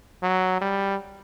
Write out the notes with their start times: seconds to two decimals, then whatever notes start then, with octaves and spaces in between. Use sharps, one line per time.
0.23 F#3
0.61 G3